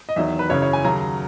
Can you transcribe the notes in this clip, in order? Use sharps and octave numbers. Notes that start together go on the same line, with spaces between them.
D#5
E2 D#3 F#3 E5
B4
F#2 C#3 E3 C#5
C#5
G#5
D#2 C#3 F#3 A#5